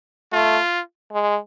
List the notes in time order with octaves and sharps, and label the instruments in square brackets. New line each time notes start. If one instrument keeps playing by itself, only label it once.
[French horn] A3 [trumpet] F4
[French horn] G#3